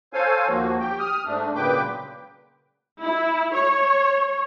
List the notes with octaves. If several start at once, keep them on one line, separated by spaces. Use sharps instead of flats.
A4 C5 C#5 F5 G#5
D#2 F3 A#3 F#4
G4 G5
D#6 F6
G#2 A3 D4
A#2 C#3 F#3 B4 G5 D6
E4
C#5